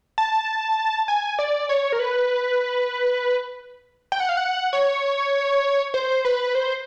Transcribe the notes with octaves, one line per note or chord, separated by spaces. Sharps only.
A5
G#5
D5
C#5
A#4
B4
G5
F#5
F5
F#5
C#5
C5
B4
C5